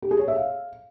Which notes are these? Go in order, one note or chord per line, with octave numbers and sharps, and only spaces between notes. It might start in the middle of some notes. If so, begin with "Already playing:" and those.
G4
G#4
C#5
E5
F5